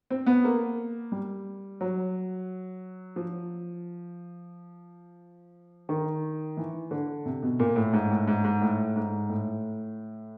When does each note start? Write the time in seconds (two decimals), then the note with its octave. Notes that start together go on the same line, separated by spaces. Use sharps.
0.10 C4
0.26 B3
0.44 A#3
1.12 G3
1.81 F#3
3.16 F3
5.89 D#3
6.57 E3
6.91 D3
7.26 C3
7.43 B2
7.59 A#2
7.76 A2
7.93 G#2
8.10 A2
8.28 G#2
8.44 G#2
8.61 A2
8.96 G#2
9.29 A2